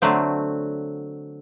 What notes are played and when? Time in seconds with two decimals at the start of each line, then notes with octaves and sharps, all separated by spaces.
0.02 D3 F#3 A3 C4